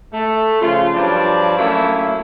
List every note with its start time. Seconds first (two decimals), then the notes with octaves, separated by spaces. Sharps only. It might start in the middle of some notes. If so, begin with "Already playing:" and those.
0.13 A3
0.61 C#3 F3 F4
0.94 G2 F3 F#3 D5
1.58 F#3 A3 A#3 C#4 E4